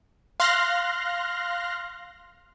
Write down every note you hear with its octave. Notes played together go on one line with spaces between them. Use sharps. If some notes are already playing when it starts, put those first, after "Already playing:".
F5 C6 F6 F#6 A#6